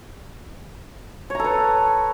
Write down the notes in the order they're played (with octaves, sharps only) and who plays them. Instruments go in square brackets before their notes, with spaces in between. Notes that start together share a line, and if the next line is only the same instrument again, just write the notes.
[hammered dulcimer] C#5
A#5
A4
B4